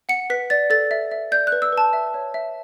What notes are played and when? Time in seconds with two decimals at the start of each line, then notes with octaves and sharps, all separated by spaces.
0.09 F#5 C#7
0.30 B4 B6
0.50 D5 A6
0.70 A4 A6
0.91 E5
1.11 E5
1.32 D5 G6
1.47 F#6
1.52 B4
1.62 E6
1.72 B4
1.78 A5
1.93 E5
2.14 C#5
2.34 E5